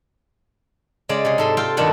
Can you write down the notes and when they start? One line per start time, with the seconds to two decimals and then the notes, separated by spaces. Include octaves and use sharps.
1.09 C#3 G#3 D5
1.25 C3 G#4
1.38 G#2 A4 C6
1.57 F4 A4 F5 G5
1.77 G2 B2 D#3 D4 A4 F#5